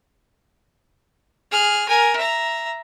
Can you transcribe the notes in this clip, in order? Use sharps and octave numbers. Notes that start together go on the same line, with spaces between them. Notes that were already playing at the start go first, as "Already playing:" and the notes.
G#4 F6
A#4 G#5
E5 A#5